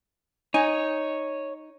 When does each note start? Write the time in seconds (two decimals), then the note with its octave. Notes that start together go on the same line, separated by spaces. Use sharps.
0.54 D#4 C#5 G#5